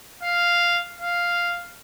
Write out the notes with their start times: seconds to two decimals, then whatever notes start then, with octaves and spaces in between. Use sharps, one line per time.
0.23 F5
1.00 F5